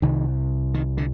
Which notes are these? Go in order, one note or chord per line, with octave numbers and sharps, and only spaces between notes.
C2 C3 D#3
D#3
D3